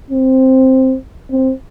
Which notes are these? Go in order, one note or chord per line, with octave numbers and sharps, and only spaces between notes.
C4
C4